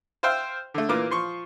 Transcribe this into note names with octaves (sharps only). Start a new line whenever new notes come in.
C5 E5 F5 G5
D3 A3
A#2 E3 A#3 D6
F3 C6 C#6